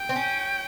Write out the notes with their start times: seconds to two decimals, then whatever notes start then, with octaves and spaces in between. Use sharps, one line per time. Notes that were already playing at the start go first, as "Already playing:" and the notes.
Already playing: G5
0.09 C4
0.16 C#4